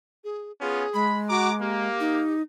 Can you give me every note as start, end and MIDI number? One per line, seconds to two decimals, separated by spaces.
0.24 0.52 68
0.61 0.84 59
0.61 0.84 61
0.61 0.84 65
0.61 1.11 68
0.94 1.88 56
0.94 1.18 83
1.29 1.48 66
1.29 1.54 82
1.29 1.54 86
1.60 2.22 58
1.60 2.35 67
2.00 2.42 63